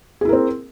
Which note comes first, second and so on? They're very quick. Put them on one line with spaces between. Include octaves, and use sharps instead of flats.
G#4 E4 A#4 C4